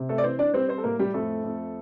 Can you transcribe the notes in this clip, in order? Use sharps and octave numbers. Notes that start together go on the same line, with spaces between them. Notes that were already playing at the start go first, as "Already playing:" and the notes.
Already playing: C3
A3 A4
D5
E3 C4 C5
D4 D5
G3 C4 C5
C4 C5
A4
A2 A#3 A#4
G3 G4
F2 A3 A4
F2